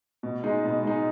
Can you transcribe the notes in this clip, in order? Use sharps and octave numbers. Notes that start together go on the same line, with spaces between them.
B2
G#3 D#4
B2
G#3 D#4